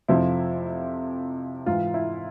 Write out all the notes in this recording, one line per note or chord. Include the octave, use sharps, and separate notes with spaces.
F2 C3 F3 E4
G#2 E3 F4
E4